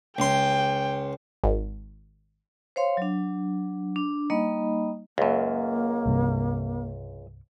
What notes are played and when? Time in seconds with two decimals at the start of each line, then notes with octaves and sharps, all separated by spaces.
0.18 C#2 G5 C6
1.44 G#1
2.76 C5 C#5 F5 C6
2.97 F#3 D4
3.96 D4
4.30 G3 A#3 D#4 D#5 B5
5.18 C#2 F#2 A#3
6.06 C2 G2 C3